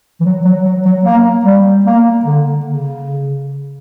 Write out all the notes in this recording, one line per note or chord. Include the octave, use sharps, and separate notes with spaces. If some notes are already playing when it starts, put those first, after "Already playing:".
E3
F#3
F#3
F#3
F#3
A#3
G3
A#3
D3
C#3